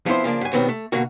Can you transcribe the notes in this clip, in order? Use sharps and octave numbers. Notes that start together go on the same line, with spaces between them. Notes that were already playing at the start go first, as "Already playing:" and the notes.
F3 B3 C4 E4 C5
C#3 F3 A#3 D4
F#2 G#5
B2 D#3 F#3 G3 B3 C4
A3
B2 D3 A#3 F#4